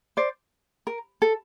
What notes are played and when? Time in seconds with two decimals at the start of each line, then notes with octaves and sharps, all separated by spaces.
0.17 C5 D5
0.87 A#4
1.22 A4